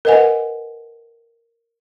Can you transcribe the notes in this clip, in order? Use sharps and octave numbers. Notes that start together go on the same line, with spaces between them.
A#4 B4 D#5 F#5 G#5